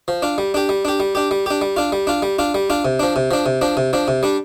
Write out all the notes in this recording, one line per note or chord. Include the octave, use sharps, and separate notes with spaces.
F3
D4 F4
G3
D4 G4
G3
D4 G4
G3
D4 G4
G3
D4 G4
G3
D4 F4
G3
D4 F4
G3
D4 F4
G3
D4 F4
C3
F3 D4
C3
F3 D4
C3
F3 D4
C3
F3 D4
C3
G3 D4